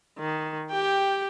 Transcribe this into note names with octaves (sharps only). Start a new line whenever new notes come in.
D#3
G4 G5